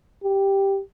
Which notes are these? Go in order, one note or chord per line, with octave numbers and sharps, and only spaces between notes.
G4